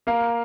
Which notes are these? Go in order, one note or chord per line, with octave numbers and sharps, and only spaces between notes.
A#3 F5